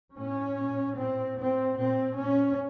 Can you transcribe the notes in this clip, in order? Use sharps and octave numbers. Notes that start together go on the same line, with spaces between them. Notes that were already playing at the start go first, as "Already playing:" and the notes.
A2 C#4
A#2
A2 C4
A2 C4
A#2 C4
A#2 C#4